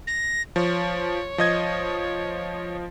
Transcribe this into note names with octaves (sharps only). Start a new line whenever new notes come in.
A#6
F3 C#5
F3 D#5 G#6